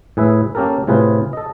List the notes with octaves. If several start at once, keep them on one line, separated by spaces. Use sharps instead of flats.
A2 G#4 B4 E5
A#3 C#4 G4 A4 A#4
A2 C3 F4 G#4 B4
A4 D#5